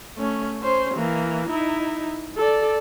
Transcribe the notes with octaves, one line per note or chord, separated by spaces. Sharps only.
A3 C#4
C#4 C5
E3 A#3
D#4 E4
A4 D5